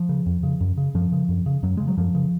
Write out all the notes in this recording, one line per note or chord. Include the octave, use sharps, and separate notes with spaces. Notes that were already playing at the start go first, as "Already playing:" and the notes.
Already playing: F3
C#3
F2
C#3
F#2
C#3
F#2 F3
C#3
F#2
C#3
F#2 F#3
C#3 G#3
F#3
F#2 F3
C#3